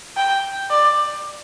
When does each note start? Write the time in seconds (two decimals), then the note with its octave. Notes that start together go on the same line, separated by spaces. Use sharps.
0.17 G5
0.71 D5